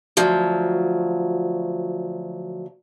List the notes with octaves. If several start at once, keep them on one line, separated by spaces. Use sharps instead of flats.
D2 F3 F#3